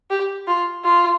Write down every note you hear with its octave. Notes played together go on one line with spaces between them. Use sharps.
G4
F4
F4